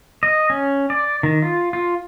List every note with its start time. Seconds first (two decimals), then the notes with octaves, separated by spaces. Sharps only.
0.23 D#5
0.50 C#4
0.90 D5
1.23 D#3
1.42 F4
1.73 F4